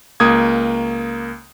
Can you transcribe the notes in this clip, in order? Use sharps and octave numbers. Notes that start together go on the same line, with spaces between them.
C#2 A#3 D#6 G#6